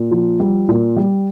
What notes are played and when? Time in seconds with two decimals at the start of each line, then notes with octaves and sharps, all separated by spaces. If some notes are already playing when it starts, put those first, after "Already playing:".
Already playing: A#2
0.11 F3
0.40 G3
0.69 A#2
0.96 G3